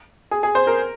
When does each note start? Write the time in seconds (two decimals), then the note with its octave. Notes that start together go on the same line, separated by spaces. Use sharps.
0.31 G#4
0.43 G#4
0.55 C5
0.67 A#4